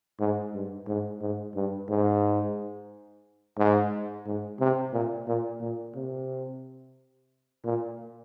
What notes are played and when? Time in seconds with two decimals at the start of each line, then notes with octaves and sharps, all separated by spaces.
0.20 G#2
0.54 G2
0.87 G#2
1.21 G#2
1.55 G2
1.89 G#2
3.58 G#2
4.26 G#2
4.60 C3
4.93 A#2
5.27 A#2
5.61 A#2
5.95 C3
7.64 A#2